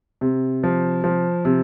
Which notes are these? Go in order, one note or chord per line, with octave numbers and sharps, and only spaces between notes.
C3
F3
F3
C3